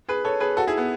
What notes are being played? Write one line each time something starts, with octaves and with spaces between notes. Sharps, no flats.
G#4 B4
A4 C#5
G#4 B4
F#4 A4
E4 G#4
B3